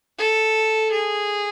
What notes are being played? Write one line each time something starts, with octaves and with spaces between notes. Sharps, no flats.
A4
G#4